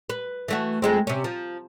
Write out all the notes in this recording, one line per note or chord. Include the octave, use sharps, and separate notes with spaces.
B4
E3 A3 F#4
F2 G#3 C4
C3 C#4
F3